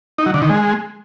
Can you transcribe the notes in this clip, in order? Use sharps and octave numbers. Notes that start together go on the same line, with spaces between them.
D#4
F#3
D3
D#3
G#3